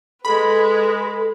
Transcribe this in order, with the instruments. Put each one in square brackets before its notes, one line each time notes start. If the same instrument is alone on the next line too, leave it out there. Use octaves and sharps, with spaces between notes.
[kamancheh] G#3 B4 [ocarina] A4 [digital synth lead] B5